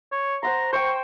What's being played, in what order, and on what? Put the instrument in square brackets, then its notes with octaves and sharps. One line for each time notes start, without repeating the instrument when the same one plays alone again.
[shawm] C#5
[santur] C5 F#5 C6 [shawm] A#5
[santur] C5 G5 [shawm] C#6